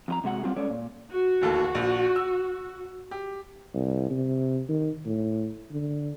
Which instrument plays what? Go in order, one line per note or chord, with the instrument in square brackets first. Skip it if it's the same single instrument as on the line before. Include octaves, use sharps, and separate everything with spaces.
[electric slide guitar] F2 F4 A#5
C3 G#3 F#4 F#5
F#3 G3 C4 F4 G#4
G#3 C#4 A4 C#5 D5
A#2
[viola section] F#4
[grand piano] D1 D#2 A4
A#1
E6
G4
[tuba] C2
C3
D#3
A2
D3